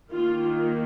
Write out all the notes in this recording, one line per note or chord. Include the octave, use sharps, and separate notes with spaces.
D#3 A#3 F4